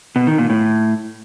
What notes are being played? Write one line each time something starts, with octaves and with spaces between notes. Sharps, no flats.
B2
D#3
A#2
A2